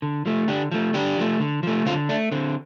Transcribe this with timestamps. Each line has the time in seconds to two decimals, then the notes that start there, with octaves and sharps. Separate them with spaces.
0.02 D3
0.26 F3 A3
0.48 D3 D4 G4
0.71 F3 A3
0.94 D3 D4 G4
1.18 F3 A3
1.40 D3
1.63 F3 A3
1.86 D3 C4 F4
2.09 A3 D4
2.32 D3 C4